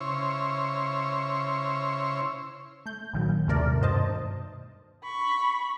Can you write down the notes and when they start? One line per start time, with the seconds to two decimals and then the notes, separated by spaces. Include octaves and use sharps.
0.01 C#3 E4 C5 C#5
2.86 A3 G6
3.13 A#1 D#3 F#3
3.48 D#2 G#2 C3 A3 A#4 D5
3.81 G2 B2 D#3 C5 D#5 A5
5.03 B5 C#6